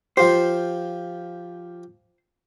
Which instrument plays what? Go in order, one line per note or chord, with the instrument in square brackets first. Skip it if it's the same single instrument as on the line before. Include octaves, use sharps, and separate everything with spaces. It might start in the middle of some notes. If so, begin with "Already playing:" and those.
[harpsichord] F3 F4 G4 [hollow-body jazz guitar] C5